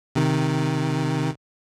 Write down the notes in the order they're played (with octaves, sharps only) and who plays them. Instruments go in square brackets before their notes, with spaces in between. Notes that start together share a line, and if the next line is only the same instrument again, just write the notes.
[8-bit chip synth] C3 D#3